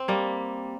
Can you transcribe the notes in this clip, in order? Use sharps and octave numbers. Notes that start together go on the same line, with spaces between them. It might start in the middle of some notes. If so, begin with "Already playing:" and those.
Already playing: C4
G3 A#3